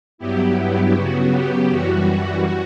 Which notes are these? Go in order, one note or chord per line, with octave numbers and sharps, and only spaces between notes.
G2 F#3 B3 E4 G4
G4
C#3 F#3 B3 F#4
G4
F#2 E3 G3 F#4